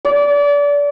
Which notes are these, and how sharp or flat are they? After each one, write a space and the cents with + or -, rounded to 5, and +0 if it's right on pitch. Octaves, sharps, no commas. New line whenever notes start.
D5 -30